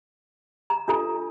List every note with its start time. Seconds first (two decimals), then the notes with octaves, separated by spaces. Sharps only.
0.70 A#5
0.88 D4 F4 A4 A#5